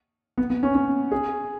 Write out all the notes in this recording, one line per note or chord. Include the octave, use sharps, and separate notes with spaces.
B3
B3
C#4
C#4
G#4